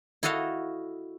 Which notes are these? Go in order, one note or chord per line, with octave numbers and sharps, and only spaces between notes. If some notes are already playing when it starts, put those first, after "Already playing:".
E4 F#4 A4 D#5 F5